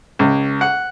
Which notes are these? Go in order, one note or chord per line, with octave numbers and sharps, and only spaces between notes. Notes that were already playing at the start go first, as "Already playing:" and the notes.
C#2
F#5